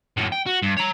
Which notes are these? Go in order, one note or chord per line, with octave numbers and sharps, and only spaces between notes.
F#2 A2
G5
F#4
G2
C#5 A#5